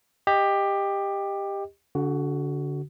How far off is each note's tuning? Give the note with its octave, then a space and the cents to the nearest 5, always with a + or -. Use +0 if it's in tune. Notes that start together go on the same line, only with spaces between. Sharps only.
G4 +15 D#5 +0
D3 -30 F#4 +15